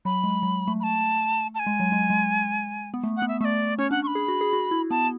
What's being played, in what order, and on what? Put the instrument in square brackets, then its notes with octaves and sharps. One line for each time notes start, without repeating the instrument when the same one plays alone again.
[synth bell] F#3 [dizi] B5
[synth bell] G#3
F#3
A3
[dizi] B5
A5
A5
G#5
[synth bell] G#3
F#3
G#3
G#3
B3
A3
[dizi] F#5
[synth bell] B3
[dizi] E5
[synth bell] A3 [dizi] E5
[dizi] D5
[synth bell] C#4 [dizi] C#5
[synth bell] D4 [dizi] F#5
[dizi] C#6
B5
[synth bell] G#4
F#4
G#4
F#4
E4
[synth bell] B3 [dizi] A5